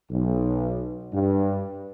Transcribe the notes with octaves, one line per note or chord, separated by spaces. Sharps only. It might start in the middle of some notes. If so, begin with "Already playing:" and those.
B1
G2